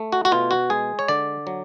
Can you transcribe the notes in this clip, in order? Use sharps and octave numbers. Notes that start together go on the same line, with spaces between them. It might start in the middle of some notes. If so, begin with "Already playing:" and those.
Already playing: A3
F#4
F#4
B2 F4
F#4
G#3 G#4
C#5
D3 D5
F#3